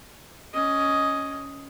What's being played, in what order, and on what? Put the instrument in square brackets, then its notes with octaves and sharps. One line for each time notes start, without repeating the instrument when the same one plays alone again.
[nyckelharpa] C#4 D#5